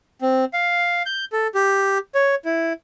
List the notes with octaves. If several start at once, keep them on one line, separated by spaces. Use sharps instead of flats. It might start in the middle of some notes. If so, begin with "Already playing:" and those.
C4
F5
G6
A4
G4
C#5
E4